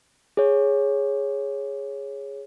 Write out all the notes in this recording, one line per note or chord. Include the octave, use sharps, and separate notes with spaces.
G#4 C#5